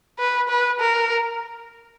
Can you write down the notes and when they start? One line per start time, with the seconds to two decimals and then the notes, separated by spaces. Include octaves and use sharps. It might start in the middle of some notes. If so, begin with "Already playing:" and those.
0.19 B4
0.49 B4
0.80 A#4